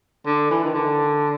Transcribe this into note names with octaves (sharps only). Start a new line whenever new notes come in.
D3
E3
D#3
D3